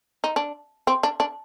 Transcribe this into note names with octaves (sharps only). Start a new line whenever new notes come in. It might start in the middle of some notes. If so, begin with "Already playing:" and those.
D#4
D4
C4
D4
D4